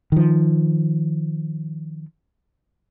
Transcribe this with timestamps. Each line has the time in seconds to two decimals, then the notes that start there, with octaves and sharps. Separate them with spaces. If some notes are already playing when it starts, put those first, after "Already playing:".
0.12 D#3 F3